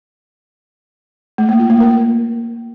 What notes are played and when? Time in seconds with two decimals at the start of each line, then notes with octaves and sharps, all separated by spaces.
1.38 A3
1.49 A#3
1.59 F4
1.70 A#3
1.80 A#4